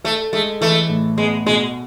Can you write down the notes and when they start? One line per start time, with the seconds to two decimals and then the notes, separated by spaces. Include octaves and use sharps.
0.04 A3 A4
0.33 G#3 A3
0.61 E3 A3
0.89 A2
1.18 G#3 B3
1.46 B2 G#3